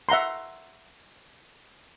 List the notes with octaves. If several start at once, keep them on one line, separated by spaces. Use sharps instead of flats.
E5 F#5 A#5 C6